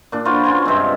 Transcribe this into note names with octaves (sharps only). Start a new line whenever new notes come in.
A#2 D4
F4 F#4 B4 C5
C#4 F4 G#5
G2 C3 G#3 C4